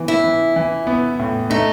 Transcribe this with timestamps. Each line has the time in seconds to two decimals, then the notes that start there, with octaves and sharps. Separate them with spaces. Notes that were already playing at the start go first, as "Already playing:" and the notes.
Already playing: E3 B3
0.08 E4
0.24 E3
0.56 E3
0.87 B3
1.19 A2
1.50 A3 D#4